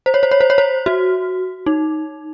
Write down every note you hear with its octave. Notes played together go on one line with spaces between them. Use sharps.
C5
C#5
C5
C#5
C5
C#5
C5
F#4
D#4